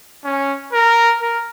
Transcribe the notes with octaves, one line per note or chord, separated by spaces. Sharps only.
C#4
A#4
A#4